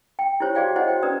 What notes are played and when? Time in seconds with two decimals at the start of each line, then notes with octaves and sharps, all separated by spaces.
0.19 G5
0.40 E4 F4 G4 C5 C#5
0.55 F#4 G#4 C5 D5 F5 G5
0.76 E4 C5 C#5 D#5 F#5
0.88 F#4 C5 G5
1.03 C#4 B4 D5 A#5 D#6